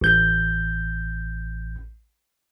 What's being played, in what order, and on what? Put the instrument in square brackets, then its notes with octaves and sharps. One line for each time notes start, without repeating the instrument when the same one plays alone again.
[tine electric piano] A1 G6